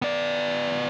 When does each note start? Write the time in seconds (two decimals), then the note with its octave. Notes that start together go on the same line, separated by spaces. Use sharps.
0.02 B3 D5